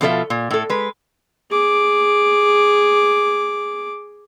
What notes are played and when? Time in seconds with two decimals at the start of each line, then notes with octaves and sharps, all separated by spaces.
0.01 B2 F3 F4 A4 D5 E5
0.30 A#2
0.51 A2 A4
0.70 G#3 B4
1.51 G#4 D6